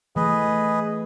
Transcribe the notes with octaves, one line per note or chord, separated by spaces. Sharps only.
E3 A3 G#4 B4 D#5